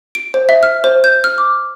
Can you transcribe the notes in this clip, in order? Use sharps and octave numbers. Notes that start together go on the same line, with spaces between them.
D7
C5
E5
F6
C5
G6
F6
D6